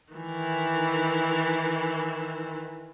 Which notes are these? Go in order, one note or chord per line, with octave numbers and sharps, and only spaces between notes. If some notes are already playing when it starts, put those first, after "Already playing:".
D#3 E3